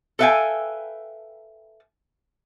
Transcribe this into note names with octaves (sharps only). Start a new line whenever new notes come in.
A4 B4 E5 F5 G5 G#5